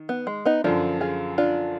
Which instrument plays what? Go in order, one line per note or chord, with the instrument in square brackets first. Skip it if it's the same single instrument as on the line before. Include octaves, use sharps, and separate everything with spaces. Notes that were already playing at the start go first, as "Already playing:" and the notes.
Already playing: [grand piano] D#3
[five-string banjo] B3
G#3
B3 D#4
[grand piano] F#2 D3 F3 [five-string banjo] D4 F4
[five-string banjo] F4 G#4
D4 F4